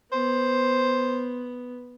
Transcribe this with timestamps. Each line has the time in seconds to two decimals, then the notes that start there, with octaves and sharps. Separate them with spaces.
0.12 B3 C5